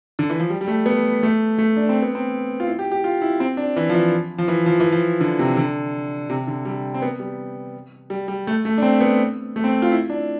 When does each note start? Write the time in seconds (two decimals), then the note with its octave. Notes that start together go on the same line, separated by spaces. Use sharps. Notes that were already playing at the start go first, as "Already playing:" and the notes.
0.19 D3
0.30 E3
0.40 F3
0.50 G3
0.61 G3
0.68 A3
0.86 B3
1.23 A3
1.58 A3
1.77 D4
1.89 C4
2.02 B3
2.15 C4
2.60 F4
2.67 E4
2.79 G4
2.91 G4
3.04 F4
3.22 E4
3.40 C4
3.57 D4
3.76 E3
3.90 F3
3.94 E3
4.38 F3
4.48 E3
4.66 F3
4.80 E3
4.92 F3
5.20 D3
5.39 C3
5.57 D3
6.30 C3
6.47 D3
6.65 G3
6.94 C4
7.02 B3
7.19 G3
8.10 G3
8.28 G3
8.47 A3
8.65 A3
8.78 D4
8.82 C4
9.01 B3
9.56 A3
9.64 C4
9.82 F4
9.92 E4
10.10 D4